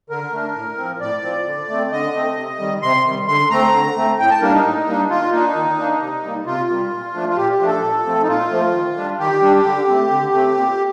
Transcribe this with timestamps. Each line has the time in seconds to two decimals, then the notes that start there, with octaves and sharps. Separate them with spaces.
0.09 D3 A#4
0.32 A3 D4
0.56 A2
0.78 F3 C4
1.01 A2 D5
1.23 F3 C4
1.46 D3
1.69 A3 C4
1.92 D3 D#5
2.14 A3 C4
2.37 C3
2.59 D#3 G3
2.82 C3 C6
3.05 D#3 G3
3.28 D3 C6
3.51 A3 C4 A#5
3.73 D3
3.96 A3 C4
4.19 A2 G5
4.31 A5
4.41 G3 A#3 D4 A#4
4.53 D#4
4.64 A2
4.87 G3 A#3 D4
5.10 D#3 F4
5.32 A#3 D4 D#4
5.55 D#3
5.78 A#3 D4
6.01 C3
6.23 G3 A#3
6.46 C3 F4
6.69 G3 A#3
6.92 A#2
7.14 F3 A3 D4
7.30 F4
7.37 A#2 G4
7.52 G4
7.60 F3 A3 D4
7.67 A4
7.83 A#2
8.05 F3 A3 C4
8.23 D#4
8.28 A#2 F4
8.50 F3 A3 C4
8.73 D#3
8.96 G3 D4
9.19 D#3 G4
9.42 G3 D4
9.64 D3
9.87 A3 C4
10.10 D3
10.33 A3 C4
10.55 A#2